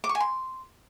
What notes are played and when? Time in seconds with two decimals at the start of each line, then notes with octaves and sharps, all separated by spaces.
0.04 D6
0.09 C#6
0.15 G#5
0.20 C6